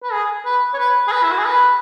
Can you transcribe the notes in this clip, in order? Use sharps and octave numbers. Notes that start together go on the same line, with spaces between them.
B4
G#4
B4
C#5
B4
G#4
B4
E4
F#4
G#4
B4